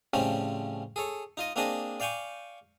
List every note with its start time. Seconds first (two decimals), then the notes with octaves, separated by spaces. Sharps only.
0.14 A2 C#3 F3 G3 C4 C#4
0.96 G#4 A4 C#5
1.37 D#4 F4 D#5
1.56 A#3 C4 D4 G#4 D#5 A5
2.00 D5 F5 G5 G#5 C#6 D6